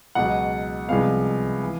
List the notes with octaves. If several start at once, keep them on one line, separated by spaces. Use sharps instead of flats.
C#2 B2 F#3 F#5
C2 C3 F3 G#3 B3 F5
E3